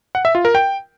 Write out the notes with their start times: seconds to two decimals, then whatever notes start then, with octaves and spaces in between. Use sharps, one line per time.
0.15 F#5
0.25 E5
0.35 F4
0.45 A#4
0.55 G5